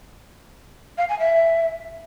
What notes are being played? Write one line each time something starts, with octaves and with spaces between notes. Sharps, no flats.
F5
G#5
E5